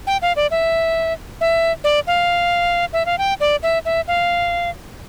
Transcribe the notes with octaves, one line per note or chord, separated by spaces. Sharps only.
G5
F5
D5
E5
E5
D5
F5
E5
F5
G5
D5
E5
E5
F5